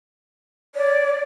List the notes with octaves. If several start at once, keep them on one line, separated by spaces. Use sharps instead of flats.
C#5 D5